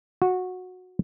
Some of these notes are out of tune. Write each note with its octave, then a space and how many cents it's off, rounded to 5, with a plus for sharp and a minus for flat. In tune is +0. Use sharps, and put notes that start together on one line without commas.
F#4 -15